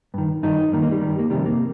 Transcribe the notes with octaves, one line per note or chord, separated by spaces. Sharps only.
G2 D#3
G2 D#3 D#4
G2 D#3 A#3
A#3
G3
G2 D#3
A#3
F2 C3 D#3 G3
A#3